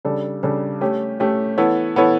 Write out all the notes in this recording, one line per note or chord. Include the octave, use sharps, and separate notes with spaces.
C#3 G3 D4 A4
C#3 G3 D4 A4
A3 C#4 G4
A3 C#4 G4
E3 B3 E4 A4 C#5
E3 B3 E4 A4 C#5